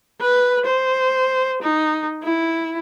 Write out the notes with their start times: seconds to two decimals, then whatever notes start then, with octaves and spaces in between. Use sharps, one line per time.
0.21 B4
0.66 C5
1.62 D#4
2.23 E4